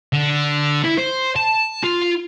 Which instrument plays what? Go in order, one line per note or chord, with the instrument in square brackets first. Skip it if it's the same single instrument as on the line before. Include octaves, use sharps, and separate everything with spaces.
[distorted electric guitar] D3
E4
C5
A5
F4